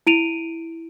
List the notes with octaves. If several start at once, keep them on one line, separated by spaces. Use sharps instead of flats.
E4 D7 D#7 F7